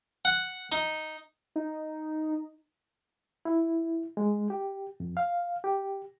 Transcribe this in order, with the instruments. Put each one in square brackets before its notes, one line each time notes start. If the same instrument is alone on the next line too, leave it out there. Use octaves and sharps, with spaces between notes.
[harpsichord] F#5
D#4
[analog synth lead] D#4
[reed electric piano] E4
G#3
G4
F2
F5
G4